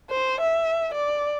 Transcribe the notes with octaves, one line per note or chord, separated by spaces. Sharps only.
C5
E5
D5